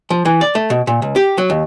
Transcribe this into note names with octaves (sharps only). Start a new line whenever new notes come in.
F3
E3
D5
A3
B2
A#2
C#2
G4
F#3
D#2